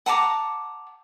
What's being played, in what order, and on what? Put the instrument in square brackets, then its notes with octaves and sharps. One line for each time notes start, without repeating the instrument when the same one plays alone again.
[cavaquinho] F#5 A5 A#5 D6